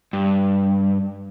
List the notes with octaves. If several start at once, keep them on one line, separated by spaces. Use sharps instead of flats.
G2